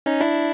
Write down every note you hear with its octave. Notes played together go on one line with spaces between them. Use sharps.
C#4 D#4
D4 E4